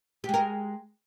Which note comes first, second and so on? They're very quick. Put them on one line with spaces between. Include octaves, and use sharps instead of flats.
G4 G#3 A#4